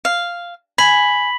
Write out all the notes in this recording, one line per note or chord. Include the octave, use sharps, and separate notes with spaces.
F5
G#5 B5 B6 F#7